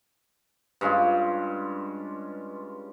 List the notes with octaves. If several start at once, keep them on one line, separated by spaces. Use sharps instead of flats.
G2 G#3 C#4 F4